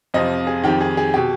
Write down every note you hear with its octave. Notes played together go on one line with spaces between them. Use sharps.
F2 C3 F3 D#5
G#4
F2 D#3 G4
G#4
G#4
B2 G4